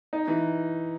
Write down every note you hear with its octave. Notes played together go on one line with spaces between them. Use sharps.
D#4
E3